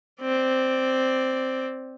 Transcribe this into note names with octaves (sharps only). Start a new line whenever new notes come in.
C4 D5